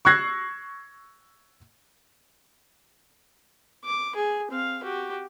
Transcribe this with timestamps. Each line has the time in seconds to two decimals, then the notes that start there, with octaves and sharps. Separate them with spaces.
0.05 C#6 E6 F#6 G#6 A#6 C7
3.85 D6
4.16 G#4
4.51 C4 F5
4.83 F#4 G4